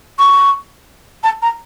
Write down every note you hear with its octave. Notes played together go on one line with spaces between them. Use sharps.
C#6
A5
A#5